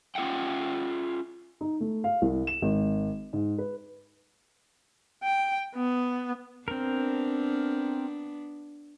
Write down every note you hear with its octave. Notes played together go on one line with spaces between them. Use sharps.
C#4 F4 A4 E5 F#5 G5
D#4
A3
F5
C2
E7
G#1
G#2
B4
G5
B3
B3 C4 D4 A#4